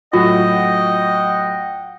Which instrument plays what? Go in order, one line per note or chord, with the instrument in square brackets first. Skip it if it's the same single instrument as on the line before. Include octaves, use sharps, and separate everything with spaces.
[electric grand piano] A2 F#3 F#4 [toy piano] F4 [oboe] D#5 [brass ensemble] F#5 G5